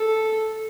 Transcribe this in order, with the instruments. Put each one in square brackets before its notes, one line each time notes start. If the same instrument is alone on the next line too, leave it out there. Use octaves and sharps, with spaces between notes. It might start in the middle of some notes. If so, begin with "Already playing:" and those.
Already playing: [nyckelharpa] A4